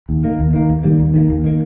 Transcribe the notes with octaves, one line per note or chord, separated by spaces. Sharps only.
D#2
D#3 A#3
D#2
D#3 A#3
D#2
D#3 G3 A#3
D#2
D#3 G3 A#3
D#2
D#3 A#3